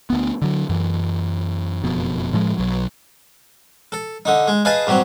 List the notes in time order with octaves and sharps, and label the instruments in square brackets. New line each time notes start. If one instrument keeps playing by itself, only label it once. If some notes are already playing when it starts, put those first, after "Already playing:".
[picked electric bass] D2 B3
D3 F#3
F#2 E3
F#1 F2 B2
A2 F3 G#3
B1 F#3
[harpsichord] A4
D3 D#4
G#3
G#4 B4 D#5 F5 A5
G2 F#3 C4